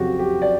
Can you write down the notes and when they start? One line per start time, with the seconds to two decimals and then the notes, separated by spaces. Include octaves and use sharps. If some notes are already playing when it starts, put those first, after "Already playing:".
Already playing: F2 C#3 F#3 F#4 G4
0.19 G4
0.42 D5